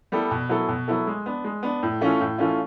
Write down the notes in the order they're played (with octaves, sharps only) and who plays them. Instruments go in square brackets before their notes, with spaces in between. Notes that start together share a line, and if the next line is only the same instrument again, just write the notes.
[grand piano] G3 B3 E4 A4
B2
F#3 B3 E4 A4
B2
F#3 B3 E4 A4
G#3
B3 D4
G#3
B3 D4
A2
E3 A3 C#4 F4
A2
E3 A3 C#4 F4